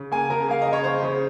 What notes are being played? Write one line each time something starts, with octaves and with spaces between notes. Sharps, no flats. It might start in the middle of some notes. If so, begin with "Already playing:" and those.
Already playing: C#3
A#3 G#5
C#3 A#4
A#3 F5
C#3 D#5
C#5
C#3 C5
C#3